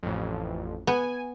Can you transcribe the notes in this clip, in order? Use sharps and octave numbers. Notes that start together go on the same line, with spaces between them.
A1 F2
B3 G#5